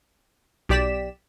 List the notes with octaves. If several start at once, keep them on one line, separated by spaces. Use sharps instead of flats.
B1 G4 D5 B6 E7